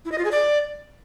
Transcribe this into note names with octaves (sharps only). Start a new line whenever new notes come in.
E4
D#5
F4
G#4
D5